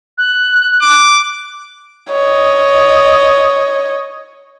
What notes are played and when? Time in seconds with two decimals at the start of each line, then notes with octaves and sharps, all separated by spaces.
0.18 F#6
0.82 D6
2.10 C#5 D#5